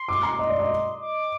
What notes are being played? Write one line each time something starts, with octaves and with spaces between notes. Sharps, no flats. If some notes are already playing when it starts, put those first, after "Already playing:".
Already playing: C6
D6
A#5
D#5 C6
D5
D#5
D6